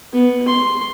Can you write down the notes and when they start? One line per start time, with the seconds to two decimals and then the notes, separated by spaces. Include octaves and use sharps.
0.13 B3
0.48 C6